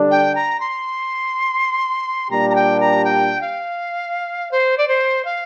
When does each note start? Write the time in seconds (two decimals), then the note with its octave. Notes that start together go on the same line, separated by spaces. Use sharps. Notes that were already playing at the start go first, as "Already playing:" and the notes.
Already playing: D3 G3 D4
0.11 G5
0.35 A#5
0.60 C6
2.31 A#2 G3 A#3 D4 G4 A#5
2.50 A#5
2.55 G5
2.80 A#5
3.05 G5
3.41 F5
4.51 C5
4.78 D5
4.88 C5
5.25 F5